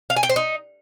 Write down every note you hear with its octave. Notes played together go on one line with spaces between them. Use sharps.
F5
G#5
G5
C5
D#4